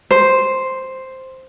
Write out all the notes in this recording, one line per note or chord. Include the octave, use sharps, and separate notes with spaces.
C5